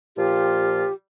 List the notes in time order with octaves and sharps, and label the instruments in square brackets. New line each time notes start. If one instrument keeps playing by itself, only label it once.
[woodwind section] A#2 F3 F4 [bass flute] G4